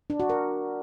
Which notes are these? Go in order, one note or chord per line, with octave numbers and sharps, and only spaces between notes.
D4
F#4
A#4